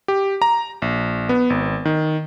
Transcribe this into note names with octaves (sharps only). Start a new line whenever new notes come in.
G4
A#5
A#1
B3
G#1
D#3